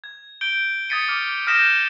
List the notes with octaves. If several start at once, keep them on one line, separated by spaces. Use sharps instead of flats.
G#6
G6 D7 G7
D#6 G#6 A6 B6 C#7 D#7
D6 F6
D#6 F6 G6 A#6 B6 E7